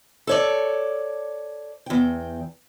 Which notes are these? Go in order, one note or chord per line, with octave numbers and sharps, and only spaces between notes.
A4 C#5 D5
E2 G5